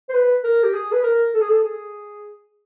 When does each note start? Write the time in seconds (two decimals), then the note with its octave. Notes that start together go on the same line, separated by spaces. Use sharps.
0.09 C5
0.14 B4
0.44 A#4
0.63 G4
0.74 G#4
0.92 B4
1.03 A#4
1.34 A4
1.41 G#4
1.49 A4
1.63 G#4